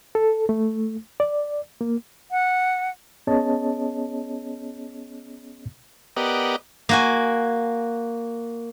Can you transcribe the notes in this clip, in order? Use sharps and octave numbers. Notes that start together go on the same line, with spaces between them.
A4
A3
D5
A#3
F#5
B3 C#4 G#4 C#5 D#5 A5
B3 G4 A#4 D5 D#5 F#5
A#3 F#4 G#5